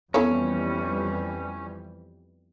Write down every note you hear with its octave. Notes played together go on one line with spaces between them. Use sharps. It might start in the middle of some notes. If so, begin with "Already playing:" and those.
F2 E3 G3 B3 C#4 E4 A4 C#5